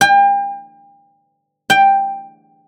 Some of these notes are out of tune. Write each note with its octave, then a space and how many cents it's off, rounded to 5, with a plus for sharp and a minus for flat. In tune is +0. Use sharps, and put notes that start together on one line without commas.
G5 +35
G5 +10